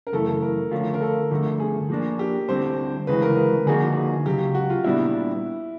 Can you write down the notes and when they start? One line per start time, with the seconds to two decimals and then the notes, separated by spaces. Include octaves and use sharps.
0.07 A#4
0.12 F#2 C#3 E3 A3 A4
0.28 A4
0.42 A#4
0.71 D3 F3 A3 C#4 F4
0.94 A#4
1.01 A4
1.31 G2 D3 F3 A3
1.60 G#4
1.89 F3 A#3 D4
2.19 G4
2.49 D2 D3 G3 C4 C5
3.07 D2 C#3 E3 G#3 B4
3.22 A#4
3.37 B4
3.66 D3 F3 A#3 D#4 F#4 G#4
4.26 C#2 C#3 F#3 G4
4.55 F#4
4.70 F4
4.84 A#2 G3 B3 D4 E4